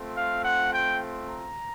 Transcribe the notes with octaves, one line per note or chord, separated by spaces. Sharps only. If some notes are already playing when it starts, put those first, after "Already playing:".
Already playing: A3 C4 F4
F5
F#5
G5
A#5